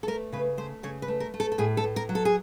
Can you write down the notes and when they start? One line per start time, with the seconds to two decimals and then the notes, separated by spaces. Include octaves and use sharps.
0.03 A4
0.08 A3 A#4
0.33 C#3 B4
0.58 A3 C5
0.83 C#3 C#5
1.02 B4
1.08 A3
1.20 A#4
1.34 A3
1.40 A4
1.52 A4
1.58 A2 G#4
1.77 A4
1.84 A2
1.96 A#4
2.09 F#3
2.15 A4
2.25 G#4